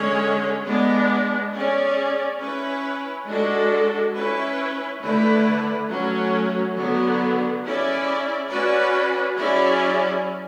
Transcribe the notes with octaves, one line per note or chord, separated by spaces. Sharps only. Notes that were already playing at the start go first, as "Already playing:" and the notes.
Already playing: D3 G#3 C#4 G#4 C#5
G#3 B3 D4
C#4 G#4 D5
C#4 E4 B4
G#3 D4 F#4 A4
C#4 E4 B4
D3 A3 E4 B4
F#3 A3 C#4
D3 F#3 B3
C#4 E4 G#4 D5
C#4 F#4 B4 D5
F#3 C#4 E4 G#4 D5